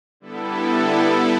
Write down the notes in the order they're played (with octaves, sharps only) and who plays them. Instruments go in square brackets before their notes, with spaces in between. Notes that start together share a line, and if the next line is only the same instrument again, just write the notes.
[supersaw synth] D3 G3 B3 E4 A4